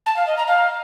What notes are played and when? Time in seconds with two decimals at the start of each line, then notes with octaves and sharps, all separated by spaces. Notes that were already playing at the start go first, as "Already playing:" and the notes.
0.06 A5
0.16 F5
0.27 D#5
0.37 A#5
0.47 F5